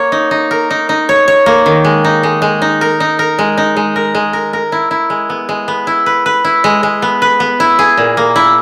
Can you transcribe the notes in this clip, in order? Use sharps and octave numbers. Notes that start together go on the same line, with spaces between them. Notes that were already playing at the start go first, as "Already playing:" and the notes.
Already playing: A#3 C#5
D#4
D#4
A#4
D#4
D#4
C#5
C#5
A#3
D#3
G#3
D#4
G#3
G#3
D#4
A#4
D#4
A#4
G#3
D#4
G#3
A#4
G#3
A#4
A#4
E4
E4
G#3
B3
G#3
B3
E4
B4
B4
E4
G#3
G#3
B3
B4
B3
E4
G#4
A#2
A#3
E4